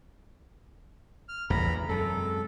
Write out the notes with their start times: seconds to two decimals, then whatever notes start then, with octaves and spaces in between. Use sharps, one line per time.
1.29 F6
1.50 A1 E2 G2 A#5 B5
1.89 F#2 C3 G#3 A4